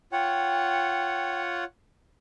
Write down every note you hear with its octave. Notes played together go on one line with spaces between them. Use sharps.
F4 C#5 F#5 G5